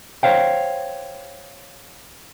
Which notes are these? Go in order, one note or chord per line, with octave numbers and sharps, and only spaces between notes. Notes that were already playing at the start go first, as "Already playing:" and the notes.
C5 C#5 F5 G5